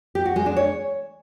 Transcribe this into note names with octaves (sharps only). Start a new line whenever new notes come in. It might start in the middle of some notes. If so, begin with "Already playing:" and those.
G4
F#4
G#3
D4
C#5